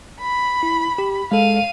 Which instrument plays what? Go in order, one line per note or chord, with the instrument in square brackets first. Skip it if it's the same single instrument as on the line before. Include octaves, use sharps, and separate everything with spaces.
[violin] B5
[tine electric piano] E4
G4
[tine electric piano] G#3 A4 [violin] F5 D#7